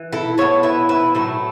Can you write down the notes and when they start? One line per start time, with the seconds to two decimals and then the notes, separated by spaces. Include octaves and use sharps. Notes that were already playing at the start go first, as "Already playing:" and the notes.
Already playing: E3
0.13 E4 A4
0.38 E3 B3 E4 A4 C#5
0.63 B4 E5
0.89 B4 E5
1.15 A2 F#3 A3 E5